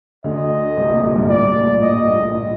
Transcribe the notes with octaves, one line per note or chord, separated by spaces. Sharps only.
D2 D3 D#5
C2 C3
A#1 A#2
A#1 A#2
G2
A2 D5
A#1 A#2
A2 D#5
A#1 A#2
A2